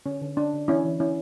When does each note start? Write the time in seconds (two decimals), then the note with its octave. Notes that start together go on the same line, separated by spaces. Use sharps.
0.06 D3 C#4
0.21 D3
0.36 C#4 D4
0.53 D3
0.68 E3 C#4 E4
0.85 E3
1.00 C#4 E4